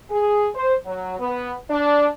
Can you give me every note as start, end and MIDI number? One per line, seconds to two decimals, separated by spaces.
0.10 0.48 68
0.55 0.75 72
0.86 1.18 54
1.20 1.53 59
1.70 2.08 62